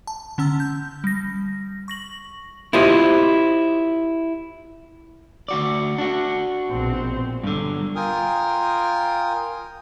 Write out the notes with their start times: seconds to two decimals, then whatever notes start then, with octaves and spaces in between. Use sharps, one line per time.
0.07 A5
0.38 D3 C#4 A5 E6
0.60 G6
1.04 G3 A#6
1.88 C#6 A#6 F#7
2.73 E4 F4 G4 C5 D#5
5.48 D2 F#4 D5
5.98 D4 F#4
6.70 A#1 B2 C4
7.44 G2 D3 F#3
7.96 F4 A#4 G5 G#5 D#6 F6